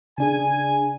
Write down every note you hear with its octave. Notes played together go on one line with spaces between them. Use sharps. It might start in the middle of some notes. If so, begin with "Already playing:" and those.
C#3 D4 G#4 G#5